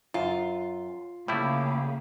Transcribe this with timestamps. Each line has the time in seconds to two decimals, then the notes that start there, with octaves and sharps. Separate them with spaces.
0.14 F#2 F4
1.28 A2 C#3 G3 A#3 E4